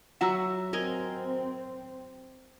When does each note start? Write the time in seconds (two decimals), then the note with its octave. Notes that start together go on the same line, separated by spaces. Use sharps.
0.21 F#3 F#4 E5 F#5 A#5 E6
0.73 C4 A#4 D#5 G#5